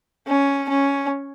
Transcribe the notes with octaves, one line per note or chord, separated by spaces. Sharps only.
C#4
C#4